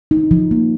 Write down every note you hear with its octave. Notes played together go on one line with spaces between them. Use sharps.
D#4
F3
A#3